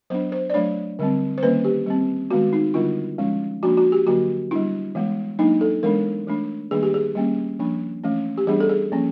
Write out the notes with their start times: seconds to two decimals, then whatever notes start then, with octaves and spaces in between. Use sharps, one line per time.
0.10 F#3 B3 D4 C5
0.32 C5
0.50 D5
0.54 F#3 A3 D4 C#5
0.99 D3 G3 C4
1.38 C5
1.43 D#3 G3 A#3 C#4 B4
1.65 G4
1.86 G3 C4
2.31 D#3 G#3 B3 F#4
2.53 D#4
2.74 D3 G3 B3 D4 F4
3.18 F3 G#3 C#4
3.63 F3 A#3 D4 F#4
3.77 F#4
3.92 G4
4.06 D3 F#3 A#3 F#4
4.51 G3 B3 D4 E4
4.95 E3 G#3 B3
5.39 F#3 A#3 D4 D#4
5.61 A4
5.83 E3 G#3 B3 D4 A#4
6.27 E3 A3 D4
6.71 D#3 G3 A#3 D4 G#4
6.83 G4
6.94 G#4
7.15 G3 A#3 C#4
7.59 F3 A#3 D4
8.04 E3 A3 C#4
8.38 G4
8.47 E3 G3 B3 D4 G#4
8.60 A4
8.69 G#4
8.92 F3 A#3 C#4